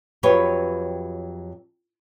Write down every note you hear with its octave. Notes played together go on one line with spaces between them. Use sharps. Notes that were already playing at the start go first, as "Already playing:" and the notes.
F2 F#3 G4 B4 C#5